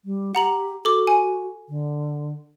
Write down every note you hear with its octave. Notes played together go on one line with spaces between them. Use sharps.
G3
G4 F#5 A#5 F#7
F#4 A4 D6
G#5
D3